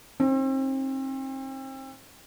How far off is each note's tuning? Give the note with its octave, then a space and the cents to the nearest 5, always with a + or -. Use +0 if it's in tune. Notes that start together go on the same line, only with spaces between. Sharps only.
C4 +35 D#4 +0